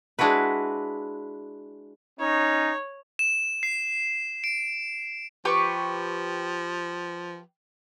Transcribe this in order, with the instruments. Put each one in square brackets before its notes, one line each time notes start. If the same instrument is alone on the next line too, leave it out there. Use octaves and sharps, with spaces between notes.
[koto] G#3 D4 E4 F#4 B4
[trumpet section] C#4 D#4 [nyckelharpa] C#5
[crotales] E7
C7
D7
[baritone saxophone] F3 [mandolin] G4 B4 C#6